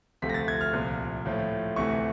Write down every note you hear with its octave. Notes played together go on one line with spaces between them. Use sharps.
D2 C3 F3 A3 B6
A#6
A6
G#6
F6
C2 A#2 F3
A2 F3 A3
D2 C3 E3 A3 C#6